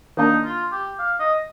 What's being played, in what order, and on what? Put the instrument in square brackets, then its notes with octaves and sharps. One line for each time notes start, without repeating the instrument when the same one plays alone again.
[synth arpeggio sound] D#3 A#3 D4 [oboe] D#4
[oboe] F4
G4
F5
D#5